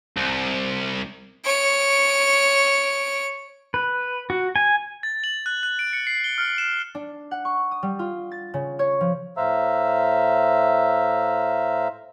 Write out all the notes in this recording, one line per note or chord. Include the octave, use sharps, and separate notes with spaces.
C2
C#5 D7
B4
F#4
G#5
A6
F#7
F#6
F#6
D7
C#7
C7
G7
F6
E7
D4
F#5
C#6
D#6
G3
F4
A6
C#3
C#5
F3
A2 C5 E5 F5 A#5 E6